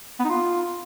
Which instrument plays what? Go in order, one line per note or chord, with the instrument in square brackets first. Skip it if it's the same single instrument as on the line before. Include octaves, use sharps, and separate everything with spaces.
[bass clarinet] B3
D#4
F4